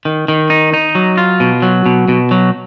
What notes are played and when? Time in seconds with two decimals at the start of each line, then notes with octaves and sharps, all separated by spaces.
0.05 D#3
0.28 D#3
0.50 D#4
0.73 D#4
0.95 F#3
1.18 F4
1.40 B2
1.62 F#3
1.86 B2
2.08 B2
2.31 F#3